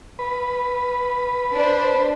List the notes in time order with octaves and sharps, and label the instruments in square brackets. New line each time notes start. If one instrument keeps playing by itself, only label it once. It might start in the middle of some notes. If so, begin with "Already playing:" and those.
[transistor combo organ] B4
[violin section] D4 C5